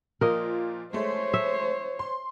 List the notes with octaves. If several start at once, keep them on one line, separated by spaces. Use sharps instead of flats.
A#2 F3 A#3 A#4 D#5
G#3 A3 C5 C#5
E5
C6